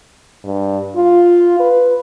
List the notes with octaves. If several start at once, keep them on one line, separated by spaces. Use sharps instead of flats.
G2
F4
B4